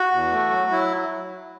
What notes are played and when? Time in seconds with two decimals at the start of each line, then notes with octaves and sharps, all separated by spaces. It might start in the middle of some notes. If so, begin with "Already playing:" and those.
Already playing: F#4
0.11 E2
0.32 A3
0.51 F#3
0.71 F#3 E4